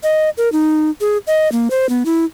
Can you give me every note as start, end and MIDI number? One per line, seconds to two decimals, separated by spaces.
0.03 0.30 75
0.37 0.51 70
0.52 0.90 63
1.01 1.18 68
1.27 1.51 75
1.52 1.68 58
1.71 1.89 72
1.89 2.03 59
2.05 2.25 64